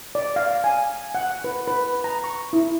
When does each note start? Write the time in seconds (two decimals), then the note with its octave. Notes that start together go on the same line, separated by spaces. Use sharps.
0.15 D5
0.36 F5
0.64 G#5
1.15 F#5
1.44 B4
1.68 B4
2.04 A#5
2.24 C#6
2.53 E4